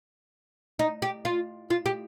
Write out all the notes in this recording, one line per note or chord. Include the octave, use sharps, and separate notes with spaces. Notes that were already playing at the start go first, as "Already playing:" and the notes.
D#4
G4
F4
F4
G4